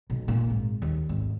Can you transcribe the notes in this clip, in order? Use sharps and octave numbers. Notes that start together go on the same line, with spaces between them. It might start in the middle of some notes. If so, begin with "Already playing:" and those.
B1
A#2
G#1
D#2
G#1